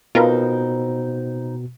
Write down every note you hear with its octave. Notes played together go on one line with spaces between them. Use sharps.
B2 C4 D#4 F4 A#4 B4